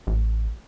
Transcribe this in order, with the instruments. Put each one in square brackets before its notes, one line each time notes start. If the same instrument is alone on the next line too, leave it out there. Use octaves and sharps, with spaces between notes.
[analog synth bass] A1